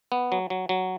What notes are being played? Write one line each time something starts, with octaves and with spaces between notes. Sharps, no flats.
B3
F#3
F#3
F#3